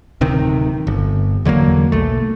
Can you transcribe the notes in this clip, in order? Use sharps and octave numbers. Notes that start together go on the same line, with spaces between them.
D1 C3 D#3
G1
E2 D3 F#3 A#3
B1 A3